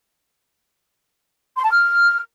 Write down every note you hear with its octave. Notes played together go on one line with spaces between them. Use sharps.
C6
A5
F6